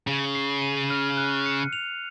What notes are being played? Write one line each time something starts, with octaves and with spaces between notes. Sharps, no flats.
C#3 F#7
C7
D#7
F6
F#6
C#7
F7